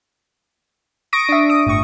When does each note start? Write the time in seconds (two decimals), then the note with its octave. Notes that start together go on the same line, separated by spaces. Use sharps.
1.13 C#6 D#6 A#6 D7
1.29 D4 E5
1.50 D#6
1.66 G1 A2 C#6